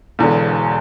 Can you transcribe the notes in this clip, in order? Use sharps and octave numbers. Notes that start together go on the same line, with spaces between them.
E1 E2 D3